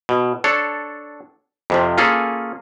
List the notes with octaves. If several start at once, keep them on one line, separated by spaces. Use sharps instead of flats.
B2
D4 A4 C#5
F2 C3 F3
A#3 C#4 F4 G#4 A4